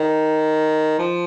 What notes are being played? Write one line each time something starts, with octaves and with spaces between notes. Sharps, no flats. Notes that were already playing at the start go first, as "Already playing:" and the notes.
Already playing: D#3
F3